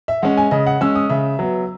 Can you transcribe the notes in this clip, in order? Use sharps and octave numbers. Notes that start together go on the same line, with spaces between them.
E5
G#3 C#4 F#5
G#5
C#3 D#5
F#5
G#3 C#4 E6
D#6
C#3 E5
F#3 B3